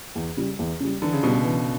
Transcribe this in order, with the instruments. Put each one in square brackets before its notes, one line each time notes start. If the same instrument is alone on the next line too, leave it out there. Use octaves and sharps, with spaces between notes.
[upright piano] E2
C#3 G3
E2
C#3 G3
[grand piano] D3 [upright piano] E3
[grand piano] C#3
[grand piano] B2 [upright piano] G3 B3
[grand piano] C#3
[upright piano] E3